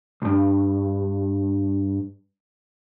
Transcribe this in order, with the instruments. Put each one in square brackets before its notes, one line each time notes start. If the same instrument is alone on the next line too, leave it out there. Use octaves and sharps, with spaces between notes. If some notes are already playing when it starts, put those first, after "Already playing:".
[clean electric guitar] B1 G2